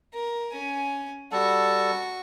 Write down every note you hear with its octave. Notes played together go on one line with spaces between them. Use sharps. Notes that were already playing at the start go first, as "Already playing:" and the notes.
A#4
C#4 G#5
G3 F#4 A4 A5 C#6